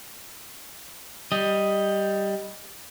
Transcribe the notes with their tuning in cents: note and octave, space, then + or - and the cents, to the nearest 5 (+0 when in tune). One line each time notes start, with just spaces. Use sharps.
G3 +0 D#5 +0